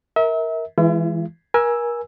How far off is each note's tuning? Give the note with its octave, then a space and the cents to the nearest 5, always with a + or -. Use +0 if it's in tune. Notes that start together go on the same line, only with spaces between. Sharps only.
A#4 +0 E5 -35
E3 +0 G#3 +0 E4 +45
A#4 +35 G#5 +0 E6 +0